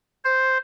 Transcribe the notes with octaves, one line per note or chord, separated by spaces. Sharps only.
C5